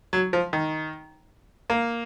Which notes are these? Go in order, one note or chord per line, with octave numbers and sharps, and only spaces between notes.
F#3
F3
D#3
A#3